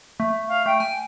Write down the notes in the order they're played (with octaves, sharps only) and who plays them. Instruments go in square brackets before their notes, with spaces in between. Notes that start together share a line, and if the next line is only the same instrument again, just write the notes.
[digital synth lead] A3
[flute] F5
[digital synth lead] A3 [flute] G5
[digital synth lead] G#5